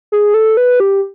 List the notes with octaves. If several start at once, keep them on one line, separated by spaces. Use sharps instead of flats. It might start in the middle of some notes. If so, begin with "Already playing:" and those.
G#4
A4
B4
G4